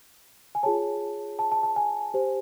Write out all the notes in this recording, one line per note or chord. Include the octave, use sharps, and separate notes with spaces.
G#5
F4 G#4 C#5 A5
A5
A5
A5
G#5
G4 C5